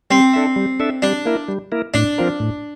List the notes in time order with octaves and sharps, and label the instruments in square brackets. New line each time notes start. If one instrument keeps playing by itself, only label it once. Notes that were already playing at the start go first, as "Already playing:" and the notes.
[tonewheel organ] G3 [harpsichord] C4
[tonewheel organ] D4 A4 E5
G3
D4 A4 E5
[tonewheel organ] G3 [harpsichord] D4
[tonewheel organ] A#3 E4 A#4
G3
A#3 E4 A#4
[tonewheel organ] A2 [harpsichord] D4
[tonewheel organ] F3 C4 F4 A#4
A2